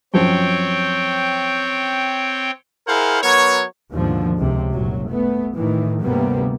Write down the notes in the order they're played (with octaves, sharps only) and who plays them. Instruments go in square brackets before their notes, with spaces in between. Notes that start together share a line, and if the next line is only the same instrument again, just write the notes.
[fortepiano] F#2 F3 [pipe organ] C4 C#5 G5
[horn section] E4 G#4 A#4 C5 F5 F#5
F#3 B3 A#4 C#5
[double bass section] D#2 G#2 B2 D3 F3
C#2 C3
F#1 C2 A#2 F#3
A3 B3
A2 D#3 E3
D2 G2 C3 G3 A#3 B3